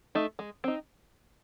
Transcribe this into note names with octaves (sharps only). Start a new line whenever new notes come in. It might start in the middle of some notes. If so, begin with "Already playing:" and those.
A3 D#4
G#3
C4 D#4